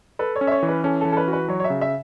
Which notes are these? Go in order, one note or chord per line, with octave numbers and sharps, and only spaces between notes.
A4 B4
C#5
C#4
E5
C#5
E3
B4
C#4 A4
A4
E3
A4
B4
F#4
B4
F#3 C#5
C#5
E5
C#3
E5